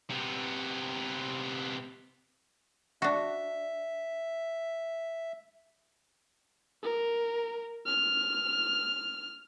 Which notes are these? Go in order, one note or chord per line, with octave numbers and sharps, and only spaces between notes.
C3 B3
D4 F#4 E5
A#4
F6